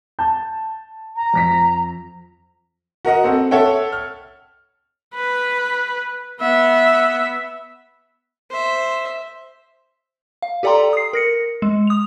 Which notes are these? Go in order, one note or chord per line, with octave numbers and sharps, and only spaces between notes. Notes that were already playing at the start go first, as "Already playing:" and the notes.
A5 G6
A#5
F2 A#6 B6
F#4 A#4 D#5 F#5
C4 A4 F#5
A4 C#5 E5 F#5 G5
F6
B4
B3 E5
C5 E5
F5
G4 A4 D5 G5 A#5 C6
D#6 C7
A#4 A#6 C#7
G#3
D#6 F7